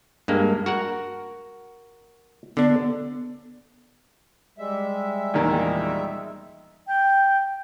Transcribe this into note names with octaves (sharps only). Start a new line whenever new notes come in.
G2 G#3 A#3
F#4 A#4 F#5
D3 B3 D4
G3 G#3 E5
E2 A#2 D#3
G5